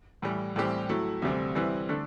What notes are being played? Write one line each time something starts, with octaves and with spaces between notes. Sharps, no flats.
A2 E3 G3
A2 E3 G3 C4 G4
F#3 A3 E4 A4
D2 C3 E3 G3 C4
E3 G3 C4 E4 B4
D3 A3 D4 A4